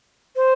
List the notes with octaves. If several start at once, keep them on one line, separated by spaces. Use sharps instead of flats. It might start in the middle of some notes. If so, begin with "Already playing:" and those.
C5